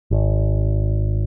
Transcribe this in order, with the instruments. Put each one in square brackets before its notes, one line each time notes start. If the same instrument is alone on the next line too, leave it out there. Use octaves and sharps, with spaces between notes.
[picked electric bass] G#1